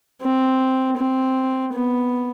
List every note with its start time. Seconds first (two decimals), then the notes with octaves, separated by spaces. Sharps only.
0.22 C4
0.97 C4
1.74 B3